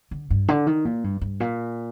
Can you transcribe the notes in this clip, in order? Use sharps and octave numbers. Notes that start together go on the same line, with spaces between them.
D3
G2
D3
D#3
A#2
G2
G2
A#2